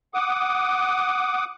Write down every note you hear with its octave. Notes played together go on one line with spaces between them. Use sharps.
F#5 D6 D#6